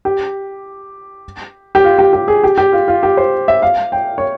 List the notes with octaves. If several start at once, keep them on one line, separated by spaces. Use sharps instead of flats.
G4
G4
F4
G4
G4
G#4
G4
G4
F4
F4
G4
C5
E5
F5
G5
C#5